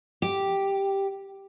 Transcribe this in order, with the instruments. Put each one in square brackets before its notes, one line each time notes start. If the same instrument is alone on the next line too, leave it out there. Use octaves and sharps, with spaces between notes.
[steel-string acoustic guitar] G4